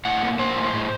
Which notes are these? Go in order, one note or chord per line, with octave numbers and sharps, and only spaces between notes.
A2 F#5
A#3
A#3 C5
A2
A2